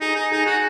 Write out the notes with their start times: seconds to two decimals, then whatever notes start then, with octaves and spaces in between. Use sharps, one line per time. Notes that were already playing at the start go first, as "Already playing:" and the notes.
0.01 D#4 G#4
0.16 D#4
0.31 D#4 G#4
0.46 F#4